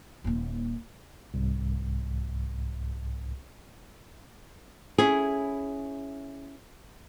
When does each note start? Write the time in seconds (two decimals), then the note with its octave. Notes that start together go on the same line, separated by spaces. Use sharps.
0.24 D#1 D#2
1.34 C2 G#2
4.98 C#4 E4 G#4